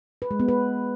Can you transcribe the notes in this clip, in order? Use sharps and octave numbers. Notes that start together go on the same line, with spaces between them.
B4
G#3
B3
B4